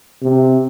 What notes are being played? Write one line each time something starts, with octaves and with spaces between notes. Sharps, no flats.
C3